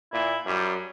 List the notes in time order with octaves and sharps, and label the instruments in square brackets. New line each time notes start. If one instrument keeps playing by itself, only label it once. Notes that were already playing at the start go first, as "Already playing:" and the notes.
[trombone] A#2 [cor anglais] E4
[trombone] F#2 [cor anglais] G3